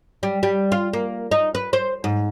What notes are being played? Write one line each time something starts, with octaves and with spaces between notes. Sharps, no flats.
G3
G3
F4
A#3
D#4
B4
C5
G#2